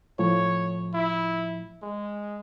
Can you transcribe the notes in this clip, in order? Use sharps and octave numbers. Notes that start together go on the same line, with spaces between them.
A2 F3 C#5
E4
G#3